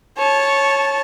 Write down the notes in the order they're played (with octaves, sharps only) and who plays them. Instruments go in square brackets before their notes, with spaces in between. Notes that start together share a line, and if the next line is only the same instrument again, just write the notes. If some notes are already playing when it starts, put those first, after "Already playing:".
[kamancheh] C#5 A5